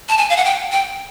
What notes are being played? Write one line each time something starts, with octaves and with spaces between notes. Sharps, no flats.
A5
G#5
F5
F#5
G5
G5